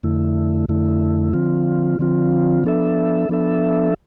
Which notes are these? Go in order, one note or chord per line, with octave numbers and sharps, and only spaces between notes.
F2 D3 A3 E4
F2 D3 A3 E4
D3 F3 C4 F4
D3 F3 C4 F4
F3 B3 D4 A4 E5
F3 B3 D4 A4 E5